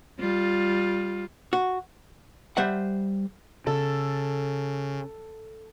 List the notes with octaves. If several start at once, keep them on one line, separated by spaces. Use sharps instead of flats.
G3 F4
F#4
G3 C5 E5 F#5
C#3 A4